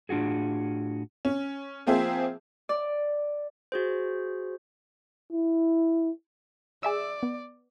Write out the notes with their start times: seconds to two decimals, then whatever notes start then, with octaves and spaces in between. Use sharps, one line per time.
0.09 A2 D4 F4 F#4 G#4
1.25 C#4
1.87 F3 A#3 C4 G#4 C5 E5
2.69 D5
3.72 F#4 G#4 C5
5.32 E4
6.83 G#4 D5 E5 E6
7.23 B3